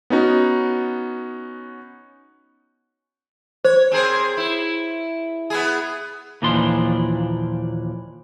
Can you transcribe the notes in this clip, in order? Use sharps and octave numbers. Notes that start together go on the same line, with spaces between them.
B3 C#4 D#4 F#4
C5 C#5
C4 G#4 A#4
E4
B3 E4 G#4
D#2 A#2 E3 F3 D4 C6